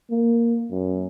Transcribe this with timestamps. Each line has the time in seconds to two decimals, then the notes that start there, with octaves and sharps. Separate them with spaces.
0.11 A#3
0.71 F#2